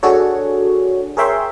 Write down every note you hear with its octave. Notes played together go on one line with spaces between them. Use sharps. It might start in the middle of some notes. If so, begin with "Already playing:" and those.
D4 F#4 G#4 A4 C#5
G#4 A#4 C#5 E5 G5 C6